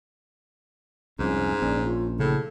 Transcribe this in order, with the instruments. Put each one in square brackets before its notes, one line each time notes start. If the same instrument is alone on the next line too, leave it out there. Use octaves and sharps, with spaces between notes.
[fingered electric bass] C2 F2 [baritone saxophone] G#2 [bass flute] C#4
[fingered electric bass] A#1 [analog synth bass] C#4 [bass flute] D5
[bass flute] F4
[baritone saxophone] A2 [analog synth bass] C#3 [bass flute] A4